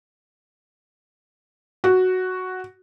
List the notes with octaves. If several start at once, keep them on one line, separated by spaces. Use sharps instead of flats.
F#4